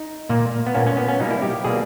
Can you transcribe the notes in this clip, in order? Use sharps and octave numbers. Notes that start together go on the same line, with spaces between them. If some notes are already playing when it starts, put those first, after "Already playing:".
Already playing: D#4
A#2 A#3
B3
A#2 A#3 C#4
C#4
B3
C#4
B2 G3 A#3 D#4
E4
G4
B2 G3 A#3 G#4